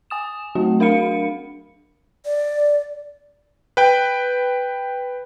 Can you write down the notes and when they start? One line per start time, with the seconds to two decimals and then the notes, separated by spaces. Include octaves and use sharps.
0.10 G#5 D#6 E7
0.55 F#3 A3 C4 F#4
0.80 D4 A#4 F5 F#5 B5 C#7
2.26 D5
3.77 B4 G5